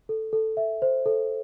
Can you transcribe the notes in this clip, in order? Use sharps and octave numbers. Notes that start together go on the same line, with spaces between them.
A4
A4
E5
C5
A4